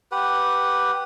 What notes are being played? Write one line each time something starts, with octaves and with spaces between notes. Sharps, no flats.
G4 B4 F#5